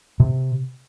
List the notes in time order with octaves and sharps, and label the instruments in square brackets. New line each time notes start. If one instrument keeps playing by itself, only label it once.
[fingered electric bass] C3